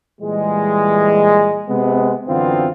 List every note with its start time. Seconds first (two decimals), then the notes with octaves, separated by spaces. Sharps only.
0.21 A#2 E3 G3 G#3
1.69 C3 G#3 B3
2.27 F#2 D3 E3 B3 C4 F4